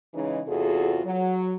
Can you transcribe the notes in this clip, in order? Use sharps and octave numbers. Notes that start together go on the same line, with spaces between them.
C#3 E3 G#3 C#4 D#4
E2 C3 F4 F#4 G#4 A4
F#3